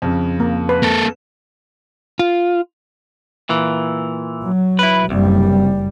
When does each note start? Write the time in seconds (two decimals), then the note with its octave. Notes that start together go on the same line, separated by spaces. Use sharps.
0.02 F2 C#3
0.40 A#3
0.69 B4
0.83 A#3 A4
2.19 F4
3.49 A#2 E3
4.45 F#3
4.79 E4 B4
5.10 F#1 C2 G3